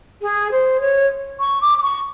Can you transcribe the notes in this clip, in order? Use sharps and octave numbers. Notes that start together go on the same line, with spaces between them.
G#4
C5
C#5
C#6
D6
D6
C#6